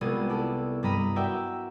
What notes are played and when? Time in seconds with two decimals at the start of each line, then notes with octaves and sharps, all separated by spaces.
0.01 C2 G#3 B3 F4 G#4
0.28 E4 A4 D5 A5
0.83 G2 G3 D#5 A#5 B5 D#7
1.16 F#4 A#4 D5 E5 G5